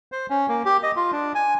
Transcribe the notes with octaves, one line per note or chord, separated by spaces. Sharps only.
C5
C#4
A#3
G4
D#5
F4
D4
G#5